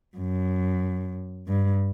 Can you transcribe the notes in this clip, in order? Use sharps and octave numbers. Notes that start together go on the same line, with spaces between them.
F#2
G2